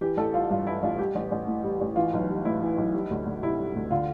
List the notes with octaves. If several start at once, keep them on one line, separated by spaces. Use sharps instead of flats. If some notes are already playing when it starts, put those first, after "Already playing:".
E3 G4
A1 A4
G3 F4
G2 F4
E3 E4
A1 F4
G3 G4
A1
A1
A2
G3
A1
E3 F4
B1
G3
A2 E4
E3
B1
G3
D2
D2
C3 E4
G3
D2
D3 F4